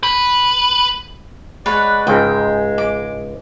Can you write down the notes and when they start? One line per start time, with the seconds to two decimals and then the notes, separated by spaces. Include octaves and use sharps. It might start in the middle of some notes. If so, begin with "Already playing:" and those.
0.03 B4
1.66 G#3 B4 C#5 D5 F#5
2.07 C#2 G#2 G#3 G5
2.78 D6